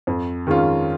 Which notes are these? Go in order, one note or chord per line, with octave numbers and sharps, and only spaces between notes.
F2
D#3 G#3 C#4 F4